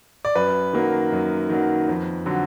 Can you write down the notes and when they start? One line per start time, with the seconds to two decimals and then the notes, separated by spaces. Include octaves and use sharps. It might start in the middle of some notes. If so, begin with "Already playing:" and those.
0.25 D5
0.36 F#2 B4
0.73 D#3 F#3 A#3
1.12 F#2
1.49 D#3 F#3 A#3
1.88 F2
2.26 D3 F#3